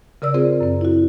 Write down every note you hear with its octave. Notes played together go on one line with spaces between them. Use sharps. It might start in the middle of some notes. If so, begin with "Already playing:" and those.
C#3 A#4 D5 E6
C4 F4 G#4 A#4 C5 D5
F#2 C4
E4 F#4